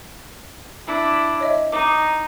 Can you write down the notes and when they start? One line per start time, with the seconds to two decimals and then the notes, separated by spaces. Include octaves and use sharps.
0.87 D4 E4
1.40 C#5 D#5 E5
1.72 D#4 D6